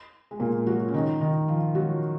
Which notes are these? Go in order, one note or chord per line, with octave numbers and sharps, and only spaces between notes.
G#3
A#2 A#3
F#3 F#4
C#4
D#3 D#4
D#3 D#4
F3 F4
F#3 F#4